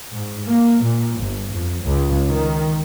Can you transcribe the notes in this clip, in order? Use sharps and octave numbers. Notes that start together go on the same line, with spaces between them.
G#2
A#3
A#2
G1
F2
C#2
D#3